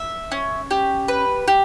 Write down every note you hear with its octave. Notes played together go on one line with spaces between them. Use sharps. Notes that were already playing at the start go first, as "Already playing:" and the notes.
Already playing: E5
C#4
G4
B4
G4